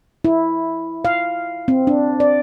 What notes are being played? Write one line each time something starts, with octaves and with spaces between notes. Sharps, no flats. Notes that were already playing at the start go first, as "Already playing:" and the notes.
E4
F5
C4
D4
D5